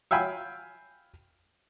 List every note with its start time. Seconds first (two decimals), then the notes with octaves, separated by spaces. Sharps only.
0.11 E5 F5 G5 G#5 B5